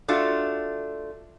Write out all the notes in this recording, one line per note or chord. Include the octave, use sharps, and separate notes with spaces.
A3 D4 F4 F#4